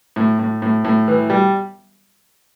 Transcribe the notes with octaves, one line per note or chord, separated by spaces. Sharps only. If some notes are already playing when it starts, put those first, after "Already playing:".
A2
A2
A2
A2
E3
G3